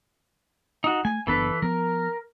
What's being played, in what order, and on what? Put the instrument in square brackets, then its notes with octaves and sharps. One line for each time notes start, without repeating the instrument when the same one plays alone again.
[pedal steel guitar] D#4 F#4
[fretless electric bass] A3 [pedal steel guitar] G#5
[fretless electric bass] F#1 B3 D4 [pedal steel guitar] E3 A4 B4
[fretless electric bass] F3 B3 [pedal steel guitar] A#4